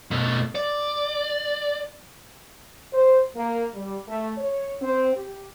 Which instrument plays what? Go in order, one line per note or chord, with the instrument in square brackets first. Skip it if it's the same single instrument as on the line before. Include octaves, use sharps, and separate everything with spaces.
[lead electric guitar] B2 A3
D5
[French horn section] C5
A#3
G3
A3
C#5
C4
G4